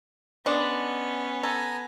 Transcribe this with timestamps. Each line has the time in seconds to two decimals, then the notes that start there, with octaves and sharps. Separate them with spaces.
0.46 G#3 B3 C#4 D4
1.43 A4 G#5 A#5